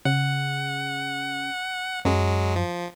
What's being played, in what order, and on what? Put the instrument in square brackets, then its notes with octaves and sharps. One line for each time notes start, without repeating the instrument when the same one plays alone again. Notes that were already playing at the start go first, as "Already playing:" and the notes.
[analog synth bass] C#3 [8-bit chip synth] F#5
[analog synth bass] F#2 [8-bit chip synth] F#3 G#3
[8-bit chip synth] F3